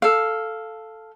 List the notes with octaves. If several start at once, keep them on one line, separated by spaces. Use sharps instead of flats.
A4 F5